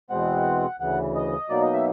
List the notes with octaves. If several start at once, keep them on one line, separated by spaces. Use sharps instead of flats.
E2 B2 G#3 C4 F#5
D2 C#3 E3 F#5
D#5
B2 F#3 A#3 D#4 D5
D#5
E5